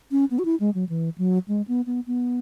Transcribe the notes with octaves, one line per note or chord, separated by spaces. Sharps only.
C#4
B3
F#4
E4
G#3
F#3
E3
F#3
G#3
B3
B3
B3